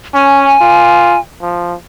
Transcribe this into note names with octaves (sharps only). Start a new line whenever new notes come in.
C#4 G#5
F4
F3